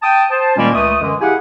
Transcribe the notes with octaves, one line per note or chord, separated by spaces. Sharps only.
G5 A5 D#6
C5 A5
A#2 D#3 G3 G#3 A#3 C#4
C#2 G#3 A3 D#6
F#2 D3 E3 G#3
E4 G4 G#4 F5 F#5 G#5